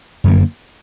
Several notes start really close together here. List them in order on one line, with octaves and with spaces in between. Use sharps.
F#2 D3 A#3